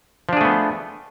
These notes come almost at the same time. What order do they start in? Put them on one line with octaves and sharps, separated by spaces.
F3 D4 G#4 A3 B3